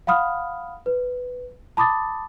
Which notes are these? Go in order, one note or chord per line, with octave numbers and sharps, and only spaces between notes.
F5 F#5 B5 D#6 F6
B4
A5 B5 D6 D#6 A6